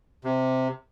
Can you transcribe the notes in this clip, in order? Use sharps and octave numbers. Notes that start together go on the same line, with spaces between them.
C3